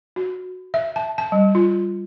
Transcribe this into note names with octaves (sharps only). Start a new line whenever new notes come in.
F#4
E5
A5
A5
G3
F4